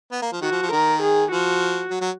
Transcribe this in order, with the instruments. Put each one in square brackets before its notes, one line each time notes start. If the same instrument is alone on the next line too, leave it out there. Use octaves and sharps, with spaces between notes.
[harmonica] B3
A#3
F3
[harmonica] D#3 [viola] F#4
[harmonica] F3
F3
[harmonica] D#3 [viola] A#4
[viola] G#4
[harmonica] F3 [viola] F#4
[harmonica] F#3
F#3